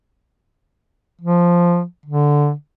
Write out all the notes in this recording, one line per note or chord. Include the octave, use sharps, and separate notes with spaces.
F3
D3